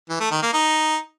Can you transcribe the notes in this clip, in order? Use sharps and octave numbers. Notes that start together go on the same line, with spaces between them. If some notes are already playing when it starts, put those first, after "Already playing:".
E3
A3
D#3
A#3
D#4